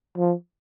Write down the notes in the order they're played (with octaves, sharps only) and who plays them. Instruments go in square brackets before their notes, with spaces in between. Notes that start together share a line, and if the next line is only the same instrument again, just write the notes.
[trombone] F3